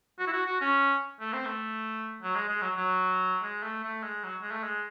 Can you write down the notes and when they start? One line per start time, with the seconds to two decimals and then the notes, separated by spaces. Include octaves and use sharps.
0.19 F#4
0.27 E4
0.33 F#4
0.46 F#4
0.61 C#4
1.20 A3
1.33 C4
1.45 A3
2.22 F#3
2.35 G#3
2.48 G#3
2.62 F#3
2.77 F#3
3.43 G#3
3.63 A3
3.84 A3
4.03 G#3
4.24 F#3
4.41 G#3
4.51 A3
4.64 G#3